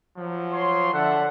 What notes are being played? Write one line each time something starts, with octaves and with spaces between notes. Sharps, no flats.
F3 F#3
C#5 C6
D3 A4 D5 E5 F#5